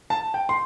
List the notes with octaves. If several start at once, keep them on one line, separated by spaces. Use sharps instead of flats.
A5
G5
C6